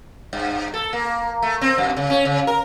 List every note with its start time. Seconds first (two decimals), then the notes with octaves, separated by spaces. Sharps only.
0.33 G2
0.74 A4
0.93 A#3
1.42 A3
1.61 C4
1.78 F#2
1.97 C#3
2.10 C#4
2.25 C#3
2.47 A#4